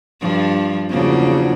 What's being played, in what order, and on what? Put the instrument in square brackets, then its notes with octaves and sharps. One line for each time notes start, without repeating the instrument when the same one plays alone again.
[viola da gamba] G2 F3
[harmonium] E2 F3 F#3 [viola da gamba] C#3 A#3 D4